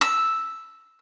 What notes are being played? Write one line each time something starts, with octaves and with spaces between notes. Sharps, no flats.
E6